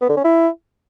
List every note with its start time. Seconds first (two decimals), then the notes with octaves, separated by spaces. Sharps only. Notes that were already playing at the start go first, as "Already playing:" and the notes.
0.01 B3
0.09 D3
0.17 C#4
0.24 E4